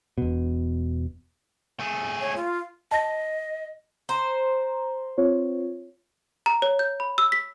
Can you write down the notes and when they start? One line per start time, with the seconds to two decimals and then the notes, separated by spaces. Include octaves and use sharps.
0.18 E1 B2
1.80 A3 G#4
2.21 C#5
2.36 F4
2.91 D#5 A5 A#6
4.09 C5 A#5
5.17 C4 F4 C#5
6.46 A#5
6.62 C#5
6.79 G6
7.00 B5
7.18 E6
7.32 B6